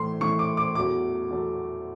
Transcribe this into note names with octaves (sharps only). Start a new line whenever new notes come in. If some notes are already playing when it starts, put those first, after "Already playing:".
Already playing: A2 E3 A3 C6
A2 E3 A3 C#6
D6
D6
E2 B2 F#3 A3 D6
E2 B2 F#3 A3